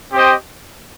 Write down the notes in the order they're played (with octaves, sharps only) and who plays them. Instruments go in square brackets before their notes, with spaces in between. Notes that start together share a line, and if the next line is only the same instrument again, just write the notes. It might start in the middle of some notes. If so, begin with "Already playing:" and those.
[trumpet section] C4 G4 C5 D#5 G5